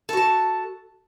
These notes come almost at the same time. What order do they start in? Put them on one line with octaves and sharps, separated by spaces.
A4 F#4 A5